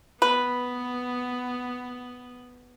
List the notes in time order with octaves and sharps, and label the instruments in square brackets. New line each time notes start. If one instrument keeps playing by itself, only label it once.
[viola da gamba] B3 [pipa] B4